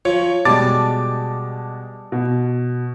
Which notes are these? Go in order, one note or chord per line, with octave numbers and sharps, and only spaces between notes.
F3 C#5
B2 G3 G#3 A5 D6 A6 D7
B2